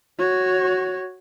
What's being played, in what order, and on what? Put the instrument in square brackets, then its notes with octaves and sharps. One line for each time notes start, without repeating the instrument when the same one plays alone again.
[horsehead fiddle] F#4 C#5